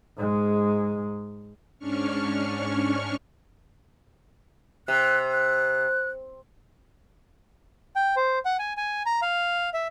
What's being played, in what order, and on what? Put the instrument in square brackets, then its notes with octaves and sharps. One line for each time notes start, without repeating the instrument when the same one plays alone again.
[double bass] G#2 G#3
[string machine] G#2 C#4 D4 C#6 F6
[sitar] C3 [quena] F#6
[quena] F#6
[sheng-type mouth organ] G5
C5
F#5
G#5
G#5
A#5
F5
E5